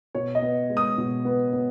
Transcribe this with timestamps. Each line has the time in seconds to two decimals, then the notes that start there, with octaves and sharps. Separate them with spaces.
0.15 B2 C#5
0.35 D#5
0.42 B3
0.70 G#3
0.77 D#6
0.98 B2
1.25 B3
1.53 B3